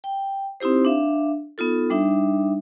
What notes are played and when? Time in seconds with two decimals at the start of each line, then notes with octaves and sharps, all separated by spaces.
0.04 G5
0.60 C4 D#4 E4 G4 C5
0.85 D4 E5 F5
1.58 B3 D#4 F4 A4
1.90 G3 D4 D#4 E5